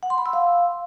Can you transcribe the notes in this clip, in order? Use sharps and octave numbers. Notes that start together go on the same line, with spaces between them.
F#5
C6
B5
E6
F5